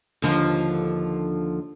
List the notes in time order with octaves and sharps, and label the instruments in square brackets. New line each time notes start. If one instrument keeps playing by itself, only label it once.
[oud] D#2 D3 F3